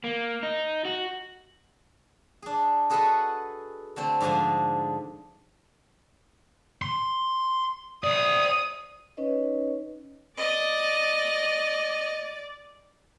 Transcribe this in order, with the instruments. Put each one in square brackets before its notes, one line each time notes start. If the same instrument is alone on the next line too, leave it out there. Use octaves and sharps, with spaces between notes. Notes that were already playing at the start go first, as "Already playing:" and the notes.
[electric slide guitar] A#3
D#4
F#4
[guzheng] D4 G#4
F#4 G#4 A4 B4 D#5 F#5
D3 A3 C4
G#2 D3 F3 D4 G#5
[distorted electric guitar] C6
[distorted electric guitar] C5 D5 [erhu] D#6
[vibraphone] C#4 D#4 B4 C#5 D#5
[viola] D5 [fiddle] D#5